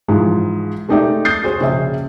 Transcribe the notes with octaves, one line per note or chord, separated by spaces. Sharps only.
G#2 E3 F3 G#3
G#3 A3 D#4 G4 D5 E5
D#6 G6 A6 C7
F#4 G#4 C5 C#5
A#1 C#3 G#4 E5